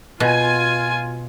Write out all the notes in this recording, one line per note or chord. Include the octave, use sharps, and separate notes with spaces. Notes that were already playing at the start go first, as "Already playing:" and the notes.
B2 F4 G#5